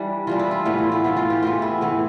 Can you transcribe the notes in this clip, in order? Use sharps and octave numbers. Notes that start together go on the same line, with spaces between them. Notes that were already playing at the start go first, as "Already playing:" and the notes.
Already playing: E3 G3 D4
E3 G3 D4 F4
E4
F4
A2 E3 B3 E4
F4
E4
A2 E3 B3 F4
F4
G4
A2 E3 B3 F4
E4
A2 E3 B3